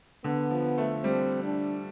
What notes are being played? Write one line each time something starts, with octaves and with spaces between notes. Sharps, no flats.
D3 B3
F3
A3
G3 C4
D4